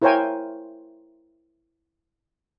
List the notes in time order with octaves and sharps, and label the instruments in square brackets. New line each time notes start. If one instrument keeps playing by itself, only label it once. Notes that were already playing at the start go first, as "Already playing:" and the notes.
[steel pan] E4 A#4 C5 C#5 G5 G#5